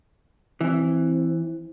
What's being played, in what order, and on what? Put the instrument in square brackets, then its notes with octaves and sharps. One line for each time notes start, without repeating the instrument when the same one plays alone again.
[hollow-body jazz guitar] E3 [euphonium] C4